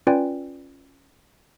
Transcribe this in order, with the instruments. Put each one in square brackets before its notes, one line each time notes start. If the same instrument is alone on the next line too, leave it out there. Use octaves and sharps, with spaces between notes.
[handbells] C#4 F4 B4 D5 G5 G#5